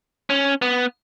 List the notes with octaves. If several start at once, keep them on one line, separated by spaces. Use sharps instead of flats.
C#4
B3